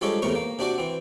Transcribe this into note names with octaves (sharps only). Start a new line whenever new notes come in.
F3 G3 G#3 D4 A4 C#5
E2 A2 C3 A#4 A#5 C#6
A#3
C3 D4 F#4 D5
E3 C4